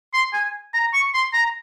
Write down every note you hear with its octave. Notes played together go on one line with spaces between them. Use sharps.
C6
G#5
A#5
C#6
C6
A#5